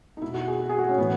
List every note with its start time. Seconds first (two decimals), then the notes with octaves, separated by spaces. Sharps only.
0.17 D#4
0.22 B2 E4
0.34 F#4
0.48 G#4
0.59 F#4
0.69 G#4
0.79 F#4
0.89 C#4
0.97 A2 E3 B3